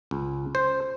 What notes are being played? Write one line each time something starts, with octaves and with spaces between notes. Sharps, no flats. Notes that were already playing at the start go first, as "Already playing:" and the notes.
C#2
C5